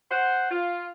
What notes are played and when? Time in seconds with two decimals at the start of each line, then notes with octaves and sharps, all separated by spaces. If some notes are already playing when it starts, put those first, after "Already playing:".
0.11 C5 F#5
0.51 F4